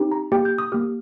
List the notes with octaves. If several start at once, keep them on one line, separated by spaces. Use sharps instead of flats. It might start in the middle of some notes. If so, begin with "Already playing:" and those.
Already playing: C4 D#4 G4
A#5
A#3 G4 G5
G6
D#6
A#3 G4 F6